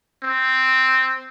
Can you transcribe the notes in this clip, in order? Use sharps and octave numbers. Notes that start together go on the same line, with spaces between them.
C4